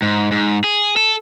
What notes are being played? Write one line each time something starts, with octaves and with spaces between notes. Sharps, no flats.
G#2
G#2
G#4
A4